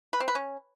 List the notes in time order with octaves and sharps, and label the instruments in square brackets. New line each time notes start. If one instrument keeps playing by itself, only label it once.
[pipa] B4
C4
B4
C#4